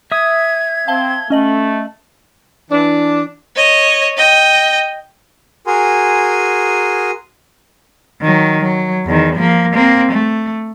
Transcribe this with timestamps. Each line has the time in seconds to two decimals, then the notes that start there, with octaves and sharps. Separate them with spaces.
0.12 E5 D#6 G#6
0.88 C4 F5 A5 G7
1.30 A3 C#4 D#5 F#7
2.71 E3 D4
3.56 C#5 D#5
4.17 D#5 G5
5.67 F#4 G#4 A#4 G#5 C6
8.22 D#3 F#3
8.61 F#3
9.06 E2 D#3
9.35 F3 A#3
9.74 A#3 C4
10.12 A3